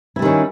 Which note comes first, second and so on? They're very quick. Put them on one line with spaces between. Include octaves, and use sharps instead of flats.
E4 G3 D#3 C#4